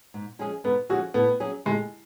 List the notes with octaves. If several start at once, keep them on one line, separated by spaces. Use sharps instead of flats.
G#2
F3 G#3 C#4 G#4
G#2 B3
F3 G#3 C#4 F#4 G#4
A2 B3
F#3 C#4 G#4
A2 G#3